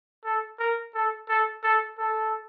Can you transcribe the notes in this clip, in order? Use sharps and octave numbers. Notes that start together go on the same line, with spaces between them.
A4
A#4
A4
A4
A4
A4